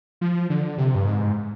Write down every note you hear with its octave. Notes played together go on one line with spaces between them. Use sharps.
F3
D3
C3
G2
G#2